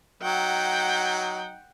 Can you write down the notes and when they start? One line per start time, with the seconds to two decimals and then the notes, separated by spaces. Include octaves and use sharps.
0.22 F#3 D#4 F#5 G5